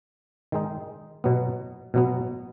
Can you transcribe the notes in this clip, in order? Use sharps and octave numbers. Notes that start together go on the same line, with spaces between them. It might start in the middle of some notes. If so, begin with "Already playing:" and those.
D#3 G#3 D#4
B2 F#3 B3
B2 F#3 B3